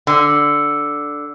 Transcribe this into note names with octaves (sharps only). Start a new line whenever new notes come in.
D3